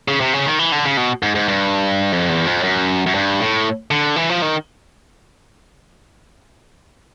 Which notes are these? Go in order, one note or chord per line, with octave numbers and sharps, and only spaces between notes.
C#3
C3
C#3
D#3
E3
D3
C#3
B2
G#2
G#2
G2
F2
E2
F2
F#2
F#2
G2
A2
D3
E3
F3
D#3